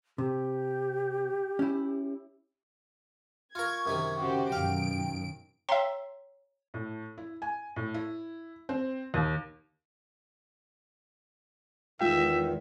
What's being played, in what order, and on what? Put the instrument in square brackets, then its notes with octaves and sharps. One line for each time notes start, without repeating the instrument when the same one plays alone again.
[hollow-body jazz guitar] C3 [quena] G4
[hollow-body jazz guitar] C#4 E4
[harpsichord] F4 A#4 [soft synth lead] C#6 [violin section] G#6
[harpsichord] F#2 C3 D#3
[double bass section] C#3 C#4 [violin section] F#4 G4 C5
[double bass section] F#2 B2 D#3 [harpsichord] F5 [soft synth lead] G5 [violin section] D7
[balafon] C#5 G5 A#5 [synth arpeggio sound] E5 C6
[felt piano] A2
E4
G#5
A2
E4
C4
D#2
[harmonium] E2 D#3 [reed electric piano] G#3 F4 G5 [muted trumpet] E5